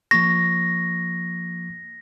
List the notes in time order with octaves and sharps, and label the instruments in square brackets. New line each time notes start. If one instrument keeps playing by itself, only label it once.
[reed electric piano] F3 A#3 C#6 [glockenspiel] A#6